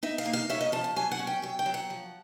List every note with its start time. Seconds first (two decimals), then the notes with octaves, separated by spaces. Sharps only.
0.03 D#4 E5
0.18 F5
0.26 A#3
0.33 F5
0.50 C#4 E5
0.61 D#5
0.72 F3 A5
0.84 A5
0.96 F#3 G#5
1.11 F#5
1.19 C#4
1.27 G5
1.42 F#3 G5
1.59 G5
1.66 F#3
1.74 F#5
1.90 F3